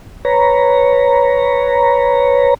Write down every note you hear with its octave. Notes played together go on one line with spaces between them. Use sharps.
B4 C#5 A#5